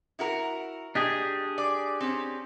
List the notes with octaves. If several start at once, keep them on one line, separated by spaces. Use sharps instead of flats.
E4 F#4 A#4
D4 G4 G#4 D#5
D5
C4 C#4